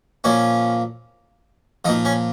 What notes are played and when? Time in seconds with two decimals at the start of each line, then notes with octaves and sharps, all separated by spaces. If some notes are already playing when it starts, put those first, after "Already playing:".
0.24 A#2 F3 C#4
1.85 F3 D#4
1.88 A#2
2.05 C#4